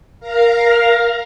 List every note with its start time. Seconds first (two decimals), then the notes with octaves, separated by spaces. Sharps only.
0.20 A#4 F5 A#5